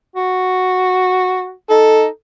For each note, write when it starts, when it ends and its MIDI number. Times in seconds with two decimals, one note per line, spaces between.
0.16 1.53 66
1.70 2.07 63
1.70 2.06 69